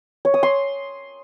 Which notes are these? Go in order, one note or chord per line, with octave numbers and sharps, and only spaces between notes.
C#5
D#6
C6